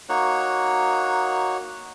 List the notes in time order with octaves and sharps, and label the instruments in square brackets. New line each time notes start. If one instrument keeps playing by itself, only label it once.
[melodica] A#3 D#4 F#4 C#5